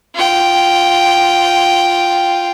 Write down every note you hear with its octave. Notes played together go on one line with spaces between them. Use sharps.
F4 G5